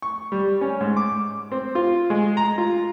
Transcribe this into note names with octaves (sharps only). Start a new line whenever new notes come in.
C#6
G3
C#4
G#2
D6
C4
F4
G#3
A#5
F4